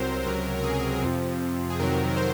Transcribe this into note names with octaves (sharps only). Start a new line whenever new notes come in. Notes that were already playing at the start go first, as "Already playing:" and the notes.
Already playing: C2 C3 F#3 A#4 C5
C#2 C3 F#3 A#4
A#4
G#4
F2 C3 F3
G#4
F2 C3 D#3 F#3 A#4
A#4
C5